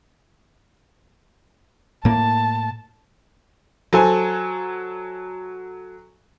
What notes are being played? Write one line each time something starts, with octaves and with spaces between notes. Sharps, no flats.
A2 A#3 A5
F#3 A4 C5 G#5